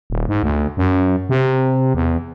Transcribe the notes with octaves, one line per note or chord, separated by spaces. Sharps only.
D#1
G#2
D2
F#2
C3
E2